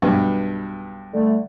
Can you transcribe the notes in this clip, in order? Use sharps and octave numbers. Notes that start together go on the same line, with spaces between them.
B1 G2 B3
D3 G3 A3